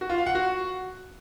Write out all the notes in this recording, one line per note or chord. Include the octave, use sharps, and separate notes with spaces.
F#4
F4
F5
F#5
F#4